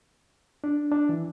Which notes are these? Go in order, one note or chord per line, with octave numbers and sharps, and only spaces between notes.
D4
D4
E3